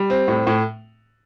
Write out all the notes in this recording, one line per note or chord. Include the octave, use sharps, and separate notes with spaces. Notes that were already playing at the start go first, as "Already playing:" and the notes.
Already playing: G3
C4
A2
A2